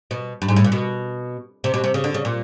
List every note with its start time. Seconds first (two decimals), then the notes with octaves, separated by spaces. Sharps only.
0.11 B2
0.42 G2
0.48 G#2
0.56 A2
0.64 A#2
0.72 B2
1.64 C3
1.74 B2
1.84 C3
1.94 C#3
2.04 D3
2.14 C#3
2.25 A#2